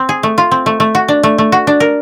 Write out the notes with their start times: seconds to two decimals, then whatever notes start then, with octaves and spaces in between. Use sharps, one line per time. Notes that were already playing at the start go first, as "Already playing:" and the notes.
Already playing: C4
0.09 G#4
0.23 A3
0.38 F4
0.51 C4
0.66 A3
0.80 A3
0.95 F#4
1.08 D4
1.23 A3
1.38 A3
1.52 F#4
1.67 D4
1.80 A#4